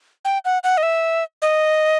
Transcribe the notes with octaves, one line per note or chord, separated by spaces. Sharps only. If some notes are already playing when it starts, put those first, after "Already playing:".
G5
F#5
F#5
D#5
E5
D#5